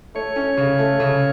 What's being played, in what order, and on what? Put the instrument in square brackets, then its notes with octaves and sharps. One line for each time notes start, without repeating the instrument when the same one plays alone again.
[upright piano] A3 [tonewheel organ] C#5
[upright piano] C#4
C#3
A3
C#3